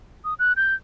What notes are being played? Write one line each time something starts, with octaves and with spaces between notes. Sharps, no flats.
D#6
F#6
G6